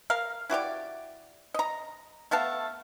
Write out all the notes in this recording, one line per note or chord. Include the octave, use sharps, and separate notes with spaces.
A#4 F5
E4 F#4 G4 D5
D#5 A#5
A3 B3 F5 A5